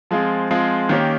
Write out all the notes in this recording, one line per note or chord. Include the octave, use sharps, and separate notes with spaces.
F3 G#3 C4 F4 G#4
F3 G#3 C4 F4 G#4
D#3 A#3 C#4 G4